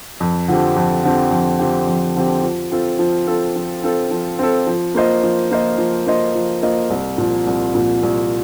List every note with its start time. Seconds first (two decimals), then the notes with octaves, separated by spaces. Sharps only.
0.20 F2
0.48 D3 F3 C4 G4
0.76 F2
1.04 D3 F3 C4 G4
1.31 F2
1.59 D3 F3 C4 G4
1.87 F2
2.16 D3 F3 C4 G4
2.43 F3
2.72 C4 F4 A4
2.99 F3
3.27 C4 F4 A4
3.56 F3
3.84 C4 F4 A4
4.11 F3
4.39 C4 F4 A4
4.67 F3
4.95 A#3 F4 C5 D#5
5.23 F3
5.51 A#3 F4 C5 D#5
5.78 F3
6.07 A#3 F4 C5 D#5
6.35 F3
6.62 A#3 F4 C5 D#5
6.90 C2
7.18 A#2 F3
7.47 C2
7.75 A#2 F3
8.03 C2